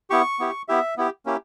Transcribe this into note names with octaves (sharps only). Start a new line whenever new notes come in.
B3 E4 G4 C#6
B3 E4 G4
B3 E4 G4 E5
B3 E4 G4
A#3 C#4 E4 G4